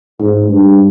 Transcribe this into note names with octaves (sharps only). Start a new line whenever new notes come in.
G#2
G2